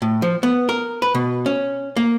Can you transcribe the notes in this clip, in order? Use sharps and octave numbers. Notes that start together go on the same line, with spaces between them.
A2
F3
B3
A#4
B4
B2
C#4
A#3